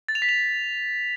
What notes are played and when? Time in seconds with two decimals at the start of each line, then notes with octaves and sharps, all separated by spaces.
0.08 A6
0.15 F7
0.22 B6
0.29 F7